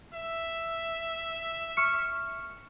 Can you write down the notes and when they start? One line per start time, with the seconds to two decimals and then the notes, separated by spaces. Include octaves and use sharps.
0.14 E5
1.77 C#6 F6 C#7